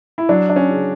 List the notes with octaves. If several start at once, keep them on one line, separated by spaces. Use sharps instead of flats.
E4
F#3 D4
D4
C#4
C#3